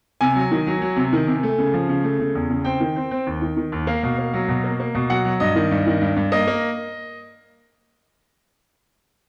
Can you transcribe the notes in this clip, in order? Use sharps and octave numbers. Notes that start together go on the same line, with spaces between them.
C3 G#5
F#3
D#3
F#3
F#3
C3
D#3
C3
A3
C#3
F3
C#3
A3
C#3
E2
C#3
C4 G5
D#3
C4
C4
D#2
D#3
D#3
D#2
A#3 F5
B2
A#3
F#3
B2
A#3
A#3
B2
F#3 F#5
F#3
G2 D#5
D#3
G2
D#3
G2
G2
A#3 D#5
A#3